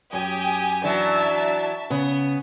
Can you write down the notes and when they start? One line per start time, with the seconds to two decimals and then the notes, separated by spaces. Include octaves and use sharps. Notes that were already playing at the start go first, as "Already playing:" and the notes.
0.13 F#2 G4 G#5 D#6
0.84 E3 F#3 D4 E5 A5
1.90 C#3 B3